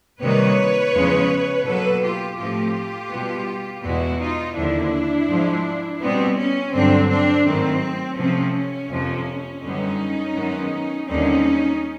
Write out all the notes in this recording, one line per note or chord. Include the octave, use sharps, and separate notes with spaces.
C3 D#3 G3 A#3 B4 C#5
E2 C#3 F3 G#3
B2 F#3 A#3 A4 B4
F4 G4
A2 F3 A3 C4 F4 G4
B2 G3 B3
E2 B2 G#3 E4 F#4
D#4 F4
D#2 D3 F3 D4 E4
G#2 F3 G#3
B2 G3 B3 C4
C#4
G2 D3 F#3 C4 D4
C4 D4
G#2 D#3 F#3 A3 C4
C3 F3 A3 C4 C#4
F2 C3 F3 A#3
F#2 D3 G3 B3 C#4 D#4
F#2 D#3 G#3 B3
D#2 D3 G3 C4 C#4 D#4